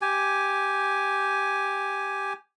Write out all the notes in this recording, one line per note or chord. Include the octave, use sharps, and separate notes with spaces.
G4 G#5